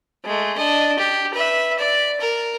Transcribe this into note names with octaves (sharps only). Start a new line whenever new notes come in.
G#3 A3
D4 D#5
G4
B4 E5
D5
A#4